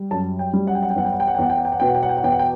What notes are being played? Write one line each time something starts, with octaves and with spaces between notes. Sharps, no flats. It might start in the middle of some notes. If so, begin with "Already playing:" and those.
Already playing: G3
F#2 A5
G5
G3
F#5
G5
F#5
G5
E2 F#5
G5
F#5
G5
F#5
G5
E2 F#5
G5
F#5
G5
F#5
B2 G5
F#5
G5
F#5
G5
F#5
E2 G5
F#5
G5